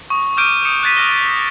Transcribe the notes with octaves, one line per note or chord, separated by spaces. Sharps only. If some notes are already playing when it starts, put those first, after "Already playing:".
C#6 D#6
D6 F6 G6 D7 D#7
D#6 C#7 E7
F#6 G6 A6 B6 D#7
D#6 F6 A#6 G7